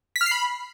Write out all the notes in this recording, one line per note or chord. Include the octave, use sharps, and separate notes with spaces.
B6
F6
C7
B5